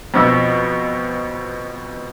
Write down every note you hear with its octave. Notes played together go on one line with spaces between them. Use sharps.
F2 B2 E6